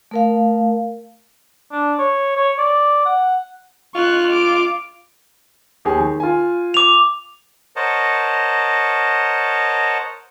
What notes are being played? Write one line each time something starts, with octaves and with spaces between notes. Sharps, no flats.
A3 A#4 F5
D4
C#5
C#5
D5
F#5
F4 C#6 F#6
D6 D7
D#2 G4 G#4
D#3
F4 G#5
D6 F7
A#4 C5 C#5 D#5 F#5 A5